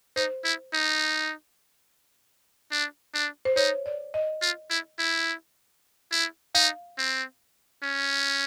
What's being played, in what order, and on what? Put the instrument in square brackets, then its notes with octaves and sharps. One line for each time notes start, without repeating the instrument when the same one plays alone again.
[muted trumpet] D#4 [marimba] C5
[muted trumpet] E4
D#4
D4
D4
[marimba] C5
[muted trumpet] D#4 [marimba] C#5
[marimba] D5
D#5
[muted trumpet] F4
E4
E4
E4
[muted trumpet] D#4 [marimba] F5
[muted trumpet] C4
C#4